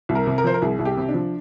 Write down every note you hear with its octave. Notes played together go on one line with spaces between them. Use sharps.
C2
A#4
C3
A#4
F3 C5
A#4
C2 G#4
C2
G4
C3
D4
F3